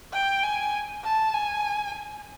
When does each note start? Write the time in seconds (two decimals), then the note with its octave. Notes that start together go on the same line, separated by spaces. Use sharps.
0.13 G5
0.43 G#5
1.04 A5
1.35 G#5